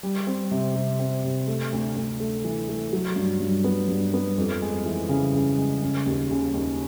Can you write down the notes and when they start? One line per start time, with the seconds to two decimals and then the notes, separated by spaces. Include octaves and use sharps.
0.03 G3
0.27 C4
0.51 C3
0.75 C3
0.99 C4
1.24 C3
1.47 A3
1.72 D2
1.96 D2
2.20 A3
2.44 E3
2.69 A3
2.93 F#3
3.16 G2
3.40 G2
3.64 B3
3.88 G2
4.14 B3
4.38 F2
4.62 G#3
4.86 E3
5.09 C#3
5.34 C#3
5.58 G#3
5.82 C#3
6.06 D#2
6.31 C#3
6.54 D#2